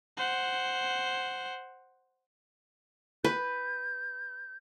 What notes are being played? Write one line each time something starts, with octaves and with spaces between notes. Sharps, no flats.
C5 F#5
B4 G6